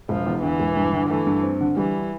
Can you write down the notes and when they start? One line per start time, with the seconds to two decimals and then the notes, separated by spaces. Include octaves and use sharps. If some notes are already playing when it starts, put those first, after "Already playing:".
0.09 E1 F3
0.26 E2
0.42 D3 E3
0.60 E1
0.77 G2
0.93 D3
1.09 E3 A3
1.27 G2
1.43 C4
1.61 D3
1.77 E3 G3